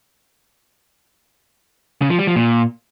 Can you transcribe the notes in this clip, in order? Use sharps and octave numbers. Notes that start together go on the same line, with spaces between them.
C#3
F3
G3
F3
A#2